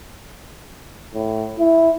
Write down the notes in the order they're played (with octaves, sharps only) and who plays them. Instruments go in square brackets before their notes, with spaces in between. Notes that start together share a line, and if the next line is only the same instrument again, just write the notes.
[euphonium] A2
E4